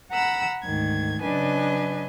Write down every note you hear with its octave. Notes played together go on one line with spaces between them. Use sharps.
F#5 A#5 B5 E6
D2 G#2 D#3 G#6
C#3 F#3 D4 B4 D#5 G#5